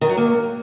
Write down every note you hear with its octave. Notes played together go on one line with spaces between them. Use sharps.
D#3
F#3
A#3